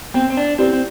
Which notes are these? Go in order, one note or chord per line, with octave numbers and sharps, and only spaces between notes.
B3 C4
C4
D4
C4 E4 G4 B4 D5
C4